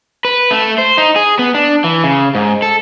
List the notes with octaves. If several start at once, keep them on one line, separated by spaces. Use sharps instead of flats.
B4
A3
C5
D#4
G#4
B3
D4
E3
C#3
G#2
A4